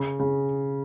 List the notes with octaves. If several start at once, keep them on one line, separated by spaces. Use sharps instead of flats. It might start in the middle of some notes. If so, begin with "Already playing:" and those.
Already playing: C#3
C#3